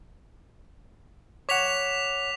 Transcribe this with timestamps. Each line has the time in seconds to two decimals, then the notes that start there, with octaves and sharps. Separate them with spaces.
1.49 C#5 F#5 D6 B6 F7